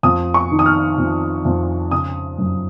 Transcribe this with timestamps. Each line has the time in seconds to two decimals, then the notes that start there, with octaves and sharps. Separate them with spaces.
0.03 F2 D#6
0.34 C#6
0.51 D#3
0.59 D#6
0.66 F6
0.98 F2
1.45 F2
1.91 C#3 D#6
2.38 F#2